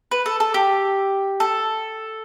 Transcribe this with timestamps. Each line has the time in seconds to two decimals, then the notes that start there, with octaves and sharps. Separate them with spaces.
0.11 B4
0.26 A4
0.40 A4
0.54 G4
1.40 A4